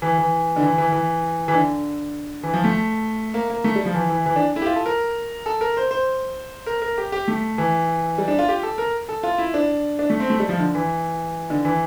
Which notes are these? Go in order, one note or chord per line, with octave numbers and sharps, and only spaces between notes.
E3
E3
D3
E3
E3
E3
E3
D3
E3
F3
A3
A#3
A#3
A3
G3
F3
E3
E3
E3
D4
E4
G4
F4
A4
A#4
A4
A#4
C5
C5
A#4
A#4
G4
G4
A3
E3
G3
D4
F4
G4
A4
A#4
A4
F4
E4
D4
D4
A3
C4
A3
G3
F3
D3
E3
D3
E3